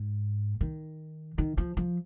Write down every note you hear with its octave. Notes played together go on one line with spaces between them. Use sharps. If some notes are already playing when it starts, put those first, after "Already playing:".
Already playing: G#2
D#3
D#3
F3
F3